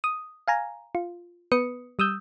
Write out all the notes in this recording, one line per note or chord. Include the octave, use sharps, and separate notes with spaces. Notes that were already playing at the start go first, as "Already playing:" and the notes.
D#6
F5 G#5 A#5
F4
B3 B4 D#6 C#7
G3 D#6 E6 G6